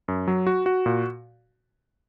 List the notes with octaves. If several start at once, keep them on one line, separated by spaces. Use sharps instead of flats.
F#2
F#3
F#4
F#4
A#2